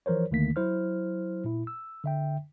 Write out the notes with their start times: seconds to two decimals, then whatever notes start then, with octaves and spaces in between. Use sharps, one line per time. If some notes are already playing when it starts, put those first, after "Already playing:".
0.06 E3 F3 A#4 C5 C#5
0.31 D2 D3 D#3 A3 A#3 B6
0.56 F#3 E4 C5 F6
1.44 A#2 E4
1.67 E6
2.04 D3 E5 G5